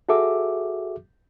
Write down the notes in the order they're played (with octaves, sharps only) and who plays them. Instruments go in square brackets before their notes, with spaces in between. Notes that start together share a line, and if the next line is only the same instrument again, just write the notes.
[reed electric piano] F#4 G#4 A4 E5 D6